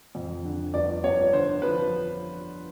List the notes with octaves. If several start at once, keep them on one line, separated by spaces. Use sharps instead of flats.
F2
D3
G1 D5
G1 C#5
D3 C5
F3 B4